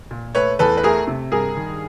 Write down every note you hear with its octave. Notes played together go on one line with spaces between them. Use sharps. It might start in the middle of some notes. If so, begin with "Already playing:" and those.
A#2
A3 B4 C#5
E2 A4 B4
B4
A3 G#4 A#4
C3
G2 G#4 A#4
D#3